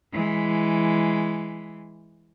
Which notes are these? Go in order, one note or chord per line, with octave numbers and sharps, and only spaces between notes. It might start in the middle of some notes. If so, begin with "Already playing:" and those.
E3 G#3